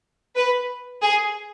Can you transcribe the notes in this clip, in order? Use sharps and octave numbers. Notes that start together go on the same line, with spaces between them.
B4
G#4